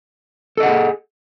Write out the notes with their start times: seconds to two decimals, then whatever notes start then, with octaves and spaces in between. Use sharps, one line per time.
0.57 A4
0.60 D#5
0.63 F#5
0.66 G#4